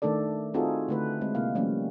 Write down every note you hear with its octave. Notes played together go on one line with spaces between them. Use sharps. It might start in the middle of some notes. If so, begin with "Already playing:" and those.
D#3 A3 D4 A4 D5
C4 D#4 F4 F#4 G#4 A4
D3 A3 B4
G#3 C4
C3 A#3 E4 F5
F3 G3 A3 A#3 C#4